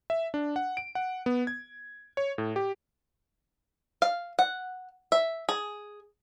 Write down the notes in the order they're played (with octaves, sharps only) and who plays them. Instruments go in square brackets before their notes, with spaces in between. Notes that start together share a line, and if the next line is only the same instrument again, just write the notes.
[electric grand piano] E5
D4
F#5
D7
F#5
B3
G#6
C#5
A2
G4
[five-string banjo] F5
F#5
E5
G#4